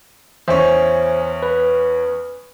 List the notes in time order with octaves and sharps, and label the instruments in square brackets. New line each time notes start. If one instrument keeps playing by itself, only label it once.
[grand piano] E2 C#4 [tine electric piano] C5 E5 G#5
[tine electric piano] B4